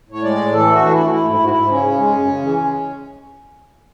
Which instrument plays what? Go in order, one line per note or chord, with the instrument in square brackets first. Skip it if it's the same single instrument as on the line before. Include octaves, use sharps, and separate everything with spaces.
[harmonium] A2 C#5
G#3 D5
A2
E3 A4
A3
F#4
E3 D4
A3 E4
F#4
A3 E4
G#2 E4
G#2 F#4
E4
G#2
C#3 C#4
C#3
G#3
F#2
C#3
E3
G#3